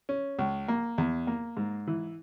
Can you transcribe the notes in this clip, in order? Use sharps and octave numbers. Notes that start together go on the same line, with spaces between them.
C#4
C#2
A#3
E2
A#3
G#2
E3